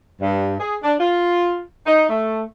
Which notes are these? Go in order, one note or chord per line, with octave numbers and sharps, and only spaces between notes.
G2
G#4
D4
F4
D#4
A3